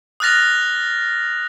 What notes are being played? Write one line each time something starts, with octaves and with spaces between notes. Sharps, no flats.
D#6 F6 F#6 A6 A#6 F7